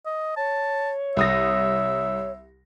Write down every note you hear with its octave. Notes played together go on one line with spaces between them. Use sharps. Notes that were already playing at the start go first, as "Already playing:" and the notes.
D#5
C#5 A5
C2 E5 D#6 A#6